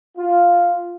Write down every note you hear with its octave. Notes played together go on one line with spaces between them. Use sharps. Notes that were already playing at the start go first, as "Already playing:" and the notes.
F4